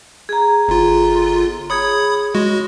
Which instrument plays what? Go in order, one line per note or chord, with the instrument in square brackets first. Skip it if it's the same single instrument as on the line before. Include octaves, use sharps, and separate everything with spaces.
[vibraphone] G#4 A#5
[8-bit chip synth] G1 F4
[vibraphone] G#4 C#5 [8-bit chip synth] B5 D#6 G#6
[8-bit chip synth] G#3 F#4